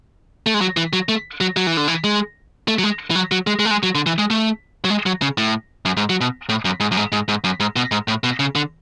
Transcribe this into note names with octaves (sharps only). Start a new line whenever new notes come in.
A3
G#3
F#3
E3
F#3
A3
F#3
F#3
E3
D3
E3
G#3
A3
F#3
G#3
E3
F#3
F#3
G#3
G#3
A3
G#3
F#3
D3
E3
G#3
A3
F#3
G#3
F#3
C#3
A2
F#2
G#2
F#3
B2
A2
F#2
G#2
F#2
G#2
G#2
G#2
F#2
G#2
B2
G#2
A2
B2
C#3
D3